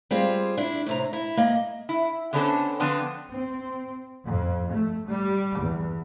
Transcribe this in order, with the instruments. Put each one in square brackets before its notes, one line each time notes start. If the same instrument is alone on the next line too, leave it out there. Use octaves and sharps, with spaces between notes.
[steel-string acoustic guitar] G3 C4 F4 G#4
D4 E4
A2 C3 A#5
E4
A#3 D#5
[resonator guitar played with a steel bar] E4
D3 B3 C#4 D4 A4 C5
D3 F3 B3 C4 D4
[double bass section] C4
F2
A3
G3
E2